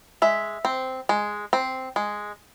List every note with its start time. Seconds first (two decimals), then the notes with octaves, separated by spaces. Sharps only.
0.22 G#3 E5
0.65 C4
1.09 G#3
1.53 C4
1.96 G#3